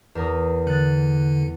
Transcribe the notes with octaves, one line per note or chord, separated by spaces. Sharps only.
E2 A#4 D#6
D3 F#6 A6